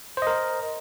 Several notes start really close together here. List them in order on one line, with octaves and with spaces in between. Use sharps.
C5 D#5 A#4